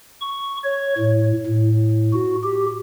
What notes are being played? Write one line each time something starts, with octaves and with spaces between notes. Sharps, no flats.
C#6
C#5
A2
A2
F#4
G4